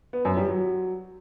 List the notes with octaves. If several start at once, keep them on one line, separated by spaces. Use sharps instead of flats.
B3
F#2
G3
F#3